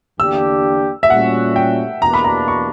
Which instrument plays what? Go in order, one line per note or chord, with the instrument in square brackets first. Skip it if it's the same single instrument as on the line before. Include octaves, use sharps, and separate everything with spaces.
[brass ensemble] E2 D3 A#3 D4 G4 [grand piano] E6
[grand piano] E5
[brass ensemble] A#2 G3 C#4 F#4 [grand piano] F#5
[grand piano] G5
[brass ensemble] E2 B2 A#3 D4 [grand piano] A#5
[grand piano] B5
A#5
C#6